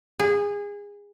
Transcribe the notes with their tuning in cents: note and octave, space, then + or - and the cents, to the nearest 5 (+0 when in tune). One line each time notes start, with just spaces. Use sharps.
G#4 -25